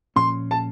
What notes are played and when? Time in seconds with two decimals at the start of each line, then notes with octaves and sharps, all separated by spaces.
0.16 A#2 F3 A#3 C#4 C6
0.51 A5